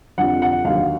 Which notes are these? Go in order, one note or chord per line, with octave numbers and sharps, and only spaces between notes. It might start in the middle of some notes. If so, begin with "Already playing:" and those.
F2 D3 G3 F#5
F#5
D#2 D3 F#3 F5